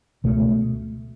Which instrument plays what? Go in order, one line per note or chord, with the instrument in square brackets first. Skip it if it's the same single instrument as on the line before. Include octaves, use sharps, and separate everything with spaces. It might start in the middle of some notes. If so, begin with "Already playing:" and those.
[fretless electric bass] C#2 B2 A3